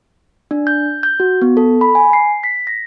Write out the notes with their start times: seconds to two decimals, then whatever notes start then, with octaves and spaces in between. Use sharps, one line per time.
0.51 D4
0.67 G6
1.03 G6
1.20 F#4
1.42 B3
1.57 A4
1.81 B5
1.95 G#5
2.13 C7
2.43 B6
2.67 A#6